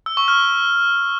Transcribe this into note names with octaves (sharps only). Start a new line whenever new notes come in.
E6
C#6
F6